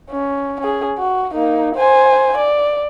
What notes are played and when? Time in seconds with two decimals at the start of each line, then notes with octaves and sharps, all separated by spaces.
0.11 C#4
0.60 C#4 G#4
0.98 F#4
1.34 A#3 D#4
1.76 C5 G#5
2.37 D5